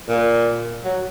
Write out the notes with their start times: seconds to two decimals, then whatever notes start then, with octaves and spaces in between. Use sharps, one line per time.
0.08 A#2
0.85 F#3